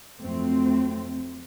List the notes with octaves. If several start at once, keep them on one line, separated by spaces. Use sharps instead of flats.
F2 F#3 A3 C4